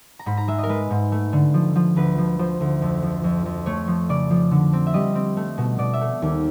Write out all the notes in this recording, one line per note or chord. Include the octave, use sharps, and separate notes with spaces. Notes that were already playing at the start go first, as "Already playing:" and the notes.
A#5
G#2 B5
A#5
G#3 E5
D#5
A#4
G#3 B4
G#2
A3
D3
F3
F3
D2 B4
F3
F3 C5
D2
F2
F3
F2
F2
A3 C#5
F3
C#3 D5
F3
D3
C4
E5
G3 D#5
C4
A3
B2
B2 D5
E5
A3
D#2